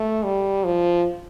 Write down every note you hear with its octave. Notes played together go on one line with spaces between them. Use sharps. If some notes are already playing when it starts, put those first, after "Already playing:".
Already playing: A3
G3
F3